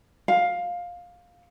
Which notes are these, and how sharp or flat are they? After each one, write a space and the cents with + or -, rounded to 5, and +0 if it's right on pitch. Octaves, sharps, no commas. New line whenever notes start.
F5 +15